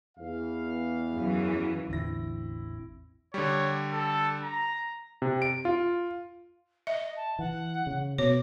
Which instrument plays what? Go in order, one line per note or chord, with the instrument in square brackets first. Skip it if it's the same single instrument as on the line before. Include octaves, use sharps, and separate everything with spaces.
[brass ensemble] E2 F5
[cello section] F#2 E3
[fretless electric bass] A1 E2 D3 [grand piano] C4 E4 A#6
[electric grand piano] D3 G3 [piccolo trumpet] C#5
[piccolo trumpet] A4
A#5
[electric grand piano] C3
D7
F4
[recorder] D#5 [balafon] E5
[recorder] A5
[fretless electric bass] E3 [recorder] F#5
[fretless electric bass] C#3
[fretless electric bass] B2 [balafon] C#5 [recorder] D6